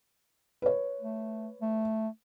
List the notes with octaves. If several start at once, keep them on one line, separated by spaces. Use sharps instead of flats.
B4 C#5
A3
A3